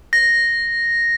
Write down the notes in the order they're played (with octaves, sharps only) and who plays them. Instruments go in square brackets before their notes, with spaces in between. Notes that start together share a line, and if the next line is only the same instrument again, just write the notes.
[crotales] A#6